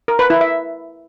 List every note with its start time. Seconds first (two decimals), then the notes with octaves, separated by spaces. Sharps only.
0.08 A#4
0.19 B4
0.30 E4
0.41 E5